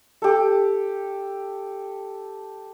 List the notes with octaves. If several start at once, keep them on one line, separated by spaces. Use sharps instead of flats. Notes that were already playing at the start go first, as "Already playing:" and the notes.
G4 A4